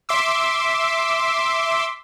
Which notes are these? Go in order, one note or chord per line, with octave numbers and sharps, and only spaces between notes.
E5 C6 D6 E6